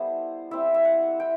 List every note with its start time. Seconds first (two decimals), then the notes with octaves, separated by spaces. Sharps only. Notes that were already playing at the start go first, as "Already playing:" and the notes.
Already playing: G3 B3 E4 A4 C5
0.51 G3 C4 E4 E5
0.74 E5
0.85 F#5
1.20 E4 G5